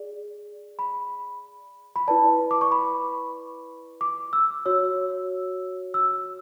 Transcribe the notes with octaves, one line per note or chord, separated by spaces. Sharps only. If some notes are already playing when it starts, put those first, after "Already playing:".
Already playing: G#4 D5
B5
B5
E4 B4 D5 A5
D6
C#6
B5
D6
E6
F#4 C#5 E6
E6